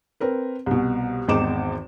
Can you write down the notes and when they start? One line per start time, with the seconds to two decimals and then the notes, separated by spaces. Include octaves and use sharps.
0.20 C4 A#4 B4
0.66 C2 B2
1.28 G#1 E2 D#3 D#4 D6 E7